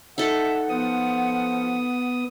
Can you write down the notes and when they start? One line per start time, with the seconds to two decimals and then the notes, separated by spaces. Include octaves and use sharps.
0.18 D#4 A4 E5 F#5
0.69 F3 B3 D#6